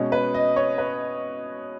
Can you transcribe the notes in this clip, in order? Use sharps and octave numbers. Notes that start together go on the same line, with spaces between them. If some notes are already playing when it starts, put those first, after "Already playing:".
Already playing: B2 G#3 C#4
B4
D#5
C#5
B4